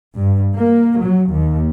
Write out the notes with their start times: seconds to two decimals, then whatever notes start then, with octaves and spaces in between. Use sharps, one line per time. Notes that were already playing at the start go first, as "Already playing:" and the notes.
0.16 G2
0.56 A#3
1.03 F#3
1.32 D#2